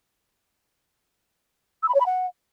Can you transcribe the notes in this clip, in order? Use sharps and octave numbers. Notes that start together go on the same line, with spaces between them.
E6
B5
C#5
B5
F#5